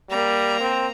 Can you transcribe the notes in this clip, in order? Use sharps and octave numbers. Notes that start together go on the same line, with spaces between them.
G3 A#3 A#5
C4